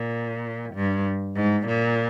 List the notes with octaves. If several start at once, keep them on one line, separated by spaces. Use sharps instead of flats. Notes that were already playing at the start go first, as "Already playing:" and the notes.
Already playing: A#2
G2
G#2
A#2